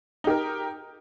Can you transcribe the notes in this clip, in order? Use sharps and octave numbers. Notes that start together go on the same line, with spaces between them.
D#4 G4 A#4